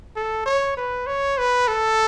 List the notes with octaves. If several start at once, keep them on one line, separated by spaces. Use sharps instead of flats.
A4
C#5
B4
C#5
B4
A4